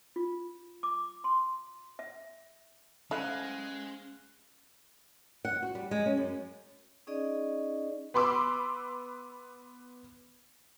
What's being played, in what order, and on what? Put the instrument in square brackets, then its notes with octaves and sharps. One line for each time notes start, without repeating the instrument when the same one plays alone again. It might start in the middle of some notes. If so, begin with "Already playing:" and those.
[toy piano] F4
D6
C6
E5
[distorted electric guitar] G#3 [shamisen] A3 E4 [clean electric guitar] C#4 C5 F#5 [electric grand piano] F5 F#6
[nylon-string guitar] F#5
F#4
G3
G#3
C#4
F#2
[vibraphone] C#4 D#4 G#4 D5 D#5
[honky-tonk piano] B3 B5 C6 D6 E6